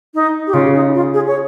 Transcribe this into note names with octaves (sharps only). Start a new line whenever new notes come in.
D#4
G4
C#3 F4
D#4
F4
G#4
C#5